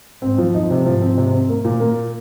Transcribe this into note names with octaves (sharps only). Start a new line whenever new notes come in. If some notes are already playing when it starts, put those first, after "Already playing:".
G#2 C4
F3
F2 D#4
C3
G#2 F3
C4
C3
C4
A#3
A#2
A#3